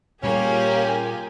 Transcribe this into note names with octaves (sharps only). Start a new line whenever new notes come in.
A#2 G3 A#3 C#4 F4 G4 G#4 G#5